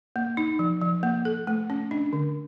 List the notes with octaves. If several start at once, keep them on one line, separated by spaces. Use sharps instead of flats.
A#3
D#4
F3
F3
A#3
A4
A3
C#4
D4
D3